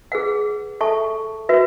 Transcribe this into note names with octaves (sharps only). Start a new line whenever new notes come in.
G#4 B4 F#5
A4 E5 A5 C#6
F#4 B4 E5